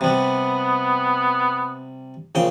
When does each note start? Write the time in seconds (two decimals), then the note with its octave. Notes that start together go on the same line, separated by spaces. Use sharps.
0.01 C3 G3 B3
2.35 A#1 C#3 G5